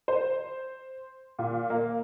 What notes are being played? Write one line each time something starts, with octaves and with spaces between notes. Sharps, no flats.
C5
A#2
A#3